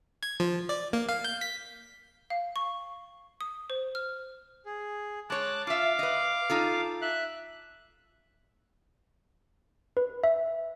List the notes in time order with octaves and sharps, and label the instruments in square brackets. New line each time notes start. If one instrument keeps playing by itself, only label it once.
[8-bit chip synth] G#6
F3
D5
A#3
F5
G6
B6
[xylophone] F5
C#6
D#6
C5
F6
[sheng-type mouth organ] G#4
[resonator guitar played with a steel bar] G#3 C#5 [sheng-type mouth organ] A5 D6 F#6
[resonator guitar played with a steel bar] F4 E5 [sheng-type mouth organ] F5 D6
[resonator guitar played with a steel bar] B4 D#5
D#4 F4 A4
[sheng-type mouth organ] E5 F#6
[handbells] B4
E5